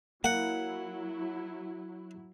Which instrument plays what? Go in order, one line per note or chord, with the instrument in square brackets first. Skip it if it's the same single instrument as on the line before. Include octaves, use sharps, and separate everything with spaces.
[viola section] F#3 E4 [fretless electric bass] A#3 [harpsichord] F#5